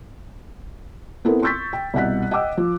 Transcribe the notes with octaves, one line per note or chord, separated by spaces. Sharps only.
B3 C4 E4 A4 A#4
C6 C#6 E6 G6 A6 B6
G5
C2 B2 F#5 F#6 B6
D#5 F#5 G5 D6 E6
F3